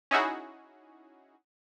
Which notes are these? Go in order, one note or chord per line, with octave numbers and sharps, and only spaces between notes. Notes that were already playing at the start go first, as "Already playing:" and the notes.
C#4 D#4 E4 F#4 G#4